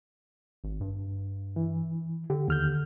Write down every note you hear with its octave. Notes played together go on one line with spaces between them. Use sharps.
G#1
G2
E3
D3 G4
D#2 F6 G6